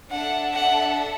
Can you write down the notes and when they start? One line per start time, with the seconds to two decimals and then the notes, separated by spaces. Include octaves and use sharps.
0.11 D4 A4 E5 F#5 A5
0.53 F#5